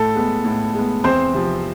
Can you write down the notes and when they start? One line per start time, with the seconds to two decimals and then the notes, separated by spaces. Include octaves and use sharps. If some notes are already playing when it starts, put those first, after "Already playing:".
Already playing: A2 A4
0.15 G#3 B3
0.45 A2
0.74 G#3 B3
1.04 E2 C4 C5
1.34 C3 F3